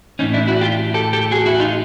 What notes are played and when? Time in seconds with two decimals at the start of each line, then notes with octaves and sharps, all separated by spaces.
0.19 A2 E3 C#4 D#4
0.34 D4 E4
0.48 E4 F#4
0.61 F4 G4
0.94 G4 A4
1.13 G4 A4
1.31 F#4 G#4
1.46 E4 F#4
1.60 D#4 F4